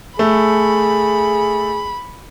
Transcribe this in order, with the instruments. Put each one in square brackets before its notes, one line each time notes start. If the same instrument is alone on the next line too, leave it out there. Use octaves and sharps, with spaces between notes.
[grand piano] A3 [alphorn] G#4 [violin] B5